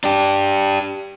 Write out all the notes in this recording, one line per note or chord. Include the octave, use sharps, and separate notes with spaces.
D4 G4